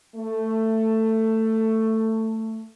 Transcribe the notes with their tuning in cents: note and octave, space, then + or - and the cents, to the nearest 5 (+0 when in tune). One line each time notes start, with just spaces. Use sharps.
A3 +15